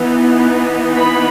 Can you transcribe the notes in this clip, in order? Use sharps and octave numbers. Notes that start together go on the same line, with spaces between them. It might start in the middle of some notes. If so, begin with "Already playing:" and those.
Already playing: E3 B3 D#4
B5